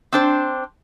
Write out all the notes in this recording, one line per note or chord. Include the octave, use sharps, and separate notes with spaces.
C4 D4 C5